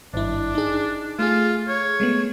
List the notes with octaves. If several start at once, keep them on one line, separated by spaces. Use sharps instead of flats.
G#1 G2 D4 E4
D#4 G#4
A3 F4 G#4
C#5
G#3 A3 B3